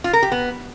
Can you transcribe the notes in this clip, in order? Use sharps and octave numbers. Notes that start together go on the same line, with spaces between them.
F4
A#4
G4
B3